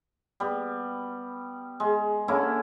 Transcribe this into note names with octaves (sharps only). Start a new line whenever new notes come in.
G3 B3
G#3
D3 A#3 C#4 E4